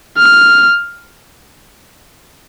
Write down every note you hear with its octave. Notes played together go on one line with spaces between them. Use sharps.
F6